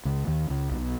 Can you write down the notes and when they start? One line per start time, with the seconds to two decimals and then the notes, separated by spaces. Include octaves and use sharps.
0.05 C#2 C#3
0.27 D#2 D#3
0.50 C#2 C#3
0.71 B1 B2